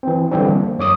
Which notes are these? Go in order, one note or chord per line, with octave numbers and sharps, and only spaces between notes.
E3 C4
D3 E3 G3 C4 D4
A#3
F#2 C#5 D6 D#6